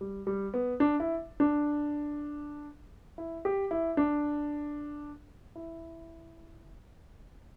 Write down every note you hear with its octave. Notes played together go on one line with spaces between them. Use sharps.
G3
G3
B3
D4
E4
D4
E4
G4
E4
D4
E4